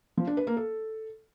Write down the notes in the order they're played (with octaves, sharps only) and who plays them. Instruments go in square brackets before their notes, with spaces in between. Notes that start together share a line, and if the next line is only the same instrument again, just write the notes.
[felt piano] F3
D4
B4
A#3
A4